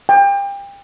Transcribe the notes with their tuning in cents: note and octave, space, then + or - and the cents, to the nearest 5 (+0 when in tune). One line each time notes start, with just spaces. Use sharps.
G5 +30